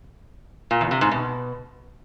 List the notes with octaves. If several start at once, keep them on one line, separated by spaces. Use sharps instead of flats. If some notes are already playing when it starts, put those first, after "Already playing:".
A#2
E2
C3
G#2
B2